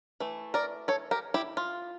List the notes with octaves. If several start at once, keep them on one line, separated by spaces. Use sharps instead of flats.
E3 A3
A#4 D5
A4 C#5
G4 A#4
E4 G4
F4